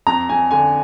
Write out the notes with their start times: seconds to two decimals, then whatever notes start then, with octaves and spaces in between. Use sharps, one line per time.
0.07 F2 A#5
0.29 F2 G#5
0.51 D3 G#5